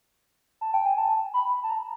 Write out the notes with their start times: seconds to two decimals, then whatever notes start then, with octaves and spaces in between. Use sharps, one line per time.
0.61 A5
0.74 G5
0.86 G#5
0.98 A5
1.34 B5
1.63 A5
1.70 A#5